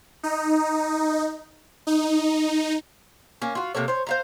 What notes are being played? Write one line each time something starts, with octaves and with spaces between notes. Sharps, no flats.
D#4
D#4
A#3 C#4
F4 F#4
C3 A#3 A4 C#5
C5 C#5
C5 F5 A#5